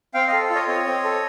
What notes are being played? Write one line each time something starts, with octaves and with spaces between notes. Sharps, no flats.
C4 F5 G5
A4 D#5 F5
F4
C#5 D#5
C4 C#5 D#5
C4
A4